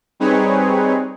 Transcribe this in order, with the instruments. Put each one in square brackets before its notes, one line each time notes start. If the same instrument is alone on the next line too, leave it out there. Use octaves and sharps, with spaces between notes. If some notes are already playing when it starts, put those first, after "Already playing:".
[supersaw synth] G3 C4 D#4 G#4 B4 C#5